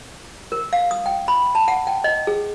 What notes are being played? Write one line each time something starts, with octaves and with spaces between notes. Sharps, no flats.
A#4
F5
D#6
G5
B5
A5
F#5
G5
D#5
G#4